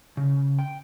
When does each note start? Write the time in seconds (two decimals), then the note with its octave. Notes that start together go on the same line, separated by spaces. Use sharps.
0.17 C#3
0.59 G5